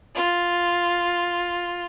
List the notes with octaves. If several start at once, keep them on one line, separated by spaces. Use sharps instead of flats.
F4